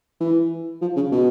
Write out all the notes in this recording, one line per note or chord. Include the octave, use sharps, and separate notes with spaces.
E3
F3
C#3
B2